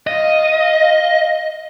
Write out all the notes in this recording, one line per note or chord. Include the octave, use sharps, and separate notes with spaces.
D#5 F5